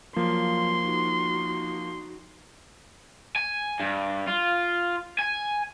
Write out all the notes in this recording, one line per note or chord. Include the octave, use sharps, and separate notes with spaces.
F3 F#3 A#3 F4 C6
D#4 F#4
G#5
G2
F4
G#5